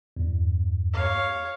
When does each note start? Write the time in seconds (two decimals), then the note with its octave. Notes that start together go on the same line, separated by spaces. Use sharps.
0.17 E2 G2
0.93 C#5 F5